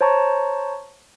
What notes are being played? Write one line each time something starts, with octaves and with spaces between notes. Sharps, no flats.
C5 C#5 A5 A#5 C#6